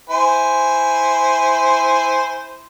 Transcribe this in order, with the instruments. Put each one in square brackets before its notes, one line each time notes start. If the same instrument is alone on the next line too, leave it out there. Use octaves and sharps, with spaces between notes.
[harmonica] E4 C5 G#5